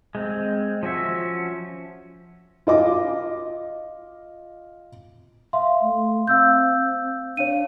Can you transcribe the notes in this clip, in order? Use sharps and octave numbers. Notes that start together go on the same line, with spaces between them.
G#3 C4
F3 C#4 F#4 E5
F4 D#5 D6
E5 F5 C6
A3
C4 F5 E6 G6
D4 C#5 F5 D#7